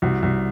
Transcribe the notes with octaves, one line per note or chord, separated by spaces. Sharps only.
C2 F#4
C2